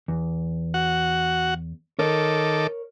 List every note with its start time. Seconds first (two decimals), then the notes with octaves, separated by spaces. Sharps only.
0.08 E2
0.74 F#4 F#5
1.99 D#3 A4 A#4 C#5 D6